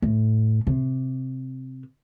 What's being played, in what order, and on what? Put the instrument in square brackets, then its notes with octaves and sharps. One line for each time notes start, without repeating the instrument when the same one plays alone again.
[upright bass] A2
C3